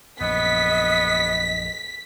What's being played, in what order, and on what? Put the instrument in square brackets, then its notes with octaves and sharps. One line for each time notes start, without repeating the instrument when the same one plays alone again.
[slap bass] A#1 F#2 [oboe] B3 [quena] D#5 [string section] B6